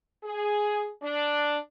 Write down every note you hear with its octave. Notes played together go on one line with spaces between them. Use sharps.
G#4
D4